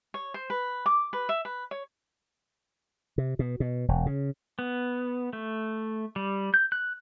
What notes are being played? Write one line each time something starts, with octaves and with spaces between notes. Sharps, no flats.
C#5
C5
B4
D6
B4
E5
B4
C#5
C3
B2
B2
E1
C#3
B3
A3
G3
G6
F#6